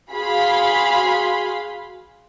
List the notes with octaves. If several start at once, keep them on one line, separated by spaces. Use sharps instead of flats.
F#4 G#4 F5 B5 C6